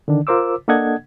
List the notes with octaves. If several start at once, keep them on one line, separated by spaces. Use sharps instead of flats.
D3 D#3 D4
F4 A#4 C5 D6 E6
A#3 D4 A4 D#5 F#5 G#6